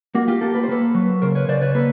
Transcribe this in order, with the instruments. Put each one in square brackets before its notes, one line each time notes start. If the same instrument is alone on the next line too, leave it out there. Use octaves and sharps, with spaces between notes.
[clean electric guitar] A#3 F#4
F4 G4
A#3 G4 A4
B4
C5
A#3 A4 B4
F#3
C#3 A#4 C5
B4 C#5
C#3 C5 D5
B4 C#5
A#3 A4 B4